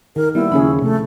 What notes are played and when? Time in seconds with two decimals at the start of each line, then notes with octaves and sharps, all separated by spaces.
0.16 D#3 A#4
0.35 G3 A#3 B3 E4
0.52 D#2 C#3 F3 C#4 G#4 B5
0.82 C3 A3